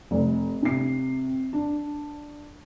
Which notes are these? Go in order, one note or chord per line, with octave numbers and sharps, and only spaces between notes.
F1
C3 C7
D4